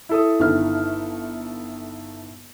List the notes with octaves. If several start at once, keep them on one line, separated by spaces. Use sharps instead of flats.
E4 A4 D#6
G1 D#3 F6